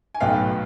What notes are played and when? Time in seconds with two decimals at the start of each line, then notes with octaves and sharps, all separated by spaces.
0.14 G#5
0.20 B1 A2 F#3 B3 F5 G5